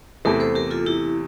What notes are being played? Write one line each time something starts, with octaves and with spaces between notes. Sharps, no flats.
E2 C3 E3 A3 G4 A#4
A4 C5
G4 A#4
F4 A4
E4 G4